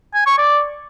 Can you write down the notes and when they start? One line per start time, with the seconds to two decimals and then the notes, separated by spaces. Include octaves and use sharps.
0.14 G#5
0.26 C#6
0.38 D5